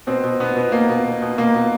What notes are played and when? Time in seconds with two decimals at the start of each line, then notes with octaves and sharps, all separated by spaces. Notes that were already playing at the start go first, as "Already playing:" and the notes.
0.07 B2 C4
0.24 B2
0.40 B2 B3
0.56 B2
0.72 B2 A#3
0.89 B2
1.05 B2
1.22 B2
1.38 B2 A#3
1.54 B2